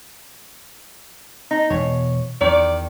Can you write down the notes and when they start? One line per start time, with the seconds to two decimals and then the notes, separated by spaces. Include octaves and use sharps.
1.51 D#4
1.70 E1 B2 C#5
2.41 E2 D#3 D5